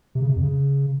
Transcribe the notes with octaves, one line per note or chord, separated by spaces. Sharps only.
C3
C#3
C3
F2
C#3